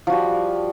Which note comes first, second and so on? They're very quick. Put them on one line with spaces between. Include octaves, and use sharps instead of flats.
F3 F#4 G3